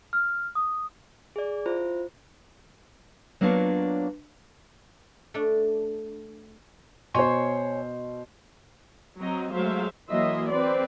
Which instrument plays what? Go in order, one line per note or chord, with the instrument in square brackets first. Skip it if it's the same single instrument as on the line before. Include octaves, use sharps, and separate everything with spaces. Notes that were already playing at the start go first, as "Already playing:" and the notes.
[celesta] F6
D#6
[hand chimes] G#4 D5
E4 F4 C5
[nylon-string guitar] F#3 A#3 B3 D4 F4 C#5
[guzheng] A3 D4
[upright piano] B2 C5 [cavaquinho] C#5 G#5 C6
[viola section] F#3 C4 D#5 A#5
F#3 G#3 A3 C5 E5 F5
E3 F#3 A#3 D#5 E5 C6
C4 B4 D5